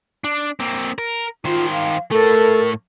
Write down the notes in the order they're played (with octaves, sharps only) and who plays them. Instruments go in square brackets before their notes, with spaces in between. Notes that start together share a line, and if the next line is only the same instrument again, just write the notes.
[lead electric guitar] D4
A#3 C4
A#4
[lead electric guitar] D#3 C5 [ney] F4
[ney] F5
[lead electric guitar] A2 A3 [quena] A4 [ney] A#4